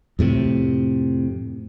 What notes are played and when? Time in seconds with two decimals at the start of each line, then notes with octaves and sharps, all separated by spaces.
0.19 F2 A2 C3